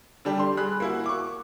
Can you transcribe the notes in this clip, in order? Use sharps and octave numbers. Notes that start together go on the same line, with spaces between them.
D3 G3 D4 G4
C6
G3 G#4 B5 F#6
A#3 E4 F#4
C#6 D6